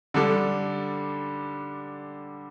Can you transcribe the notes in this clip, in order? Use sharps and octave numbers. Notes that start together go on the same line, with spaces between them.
D3 G3 D4 A4